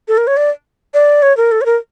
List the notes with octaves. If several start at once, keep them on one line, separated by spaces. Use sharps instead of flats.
A4
A#4
C#5
D5
D5
C#5
A#4
A4
C#5
A#4